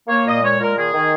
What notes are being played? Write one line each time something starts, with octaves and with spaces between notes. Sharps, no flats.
A#3 C#5
A#2 D#5
G#3 C#5
A#2 A#4
D#3 G#4
D#3